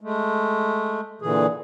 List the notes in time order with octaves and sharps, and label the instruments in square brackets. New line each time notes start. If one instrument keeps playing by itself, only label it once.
[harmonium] G#3 A3
A#2 D3 E3 G#4